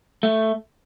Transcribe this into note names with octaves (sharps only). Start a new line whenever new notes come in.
A3